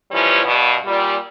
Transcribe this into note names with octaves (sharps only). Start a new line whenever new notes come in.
E3 F3 G3 C#4
G2 B2
A#2 G3